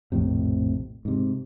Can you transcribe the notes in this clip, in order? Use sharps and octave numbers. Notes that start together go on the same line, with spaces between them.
A#1 F2 A2 C3
G#2 C3